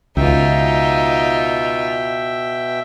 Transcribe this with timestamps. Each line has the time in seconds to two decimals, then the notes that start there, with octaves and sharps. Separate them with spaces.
0.17 C#2 B2 D#4 F4 E5 G5